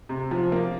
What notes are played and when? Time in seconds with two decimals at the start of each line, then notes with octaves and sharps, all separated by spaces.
0.09 C3
0.31 F3
0.52 A#3